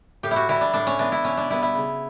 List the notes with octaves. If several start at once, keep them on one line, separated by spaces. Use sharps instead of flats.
A2 G4
E4
F#4
E3 G3 E4
D4
A2 D4
C#4
E3 B3 D4
E4
B2 C#4
D4
G3 B3 E4
E4
C#3